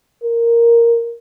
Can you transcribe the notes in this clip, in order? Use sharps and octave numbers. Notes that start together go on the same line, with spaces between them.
A#4